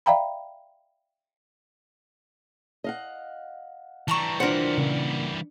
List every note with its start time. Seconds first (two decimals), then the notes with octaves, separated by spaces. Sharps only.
0.06 D5 E5 F5 G5 A#5 B5
2.84 D#5 F5 F#5
4.08 E3 G3 A5 A#5 C#6
4.40 D4 F4 A#4 C5 F#5
4.77 A#2 C#3